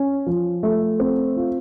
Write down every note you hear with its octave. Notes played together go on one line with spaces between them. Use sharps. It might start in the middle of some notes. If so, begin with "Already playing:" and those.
Already playing: C#4
F3
A3
C4
F4